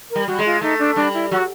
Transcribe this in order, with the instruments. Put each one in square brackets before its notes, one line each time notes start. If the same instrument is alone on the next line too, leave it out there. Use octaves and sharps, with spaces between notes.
[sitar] G3 [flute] A#4
[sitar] G3 [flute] F#4
[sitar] G#3
[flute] F4
[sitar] A3 [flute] D#4
[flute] D4
[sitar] G3 [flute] D4
[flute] E4
[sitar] F#3 [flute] F#4